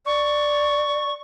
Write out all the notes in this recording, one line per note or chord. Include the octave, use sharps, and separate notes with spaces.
D5 C#6